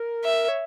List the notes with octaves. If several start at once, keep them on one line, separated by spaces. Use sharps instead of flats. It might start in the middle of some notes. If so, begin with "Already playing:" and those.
Already playing: A#4
E5
C#5